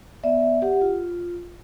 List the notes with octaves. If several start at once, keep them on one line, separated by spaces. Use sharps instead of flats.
B3 D5 E5
G4 F#5
F4